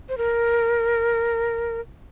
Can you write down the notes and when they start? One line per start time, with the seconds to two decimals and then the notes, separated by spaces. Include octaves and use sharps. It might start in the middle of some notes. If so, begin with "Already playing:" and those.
0.09 C5
0.18 A#4